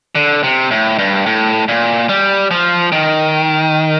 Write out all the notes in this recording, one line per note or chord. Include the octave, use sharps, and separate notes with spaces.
D3
C3
A2
G2
A2
A#2
G3
F3
D#3